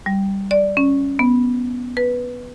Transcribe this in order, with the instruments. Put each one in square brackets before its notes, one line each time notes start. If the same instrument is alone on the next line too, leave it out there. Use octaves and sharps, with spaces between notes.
[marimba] G3
D5
C#4
B3
B4